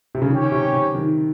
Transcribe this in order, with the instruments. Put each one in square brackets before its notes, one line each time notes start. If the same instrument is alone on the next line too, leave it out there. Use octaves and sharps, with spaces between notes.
[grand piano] C3
C#3
[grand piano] D#3 [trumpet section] C#4 G4 C#5 G5
[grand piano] C3
C3
D#3